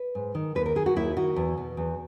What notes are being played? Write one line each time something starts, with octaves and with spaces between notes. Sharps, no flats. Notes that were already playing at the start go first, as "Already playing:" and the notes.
Already playing: B4
G#2
D#3
D#2 B4
A#4
D#3 G#4
F#4
D#2 E4
D#3 F#4
E2
B2
E2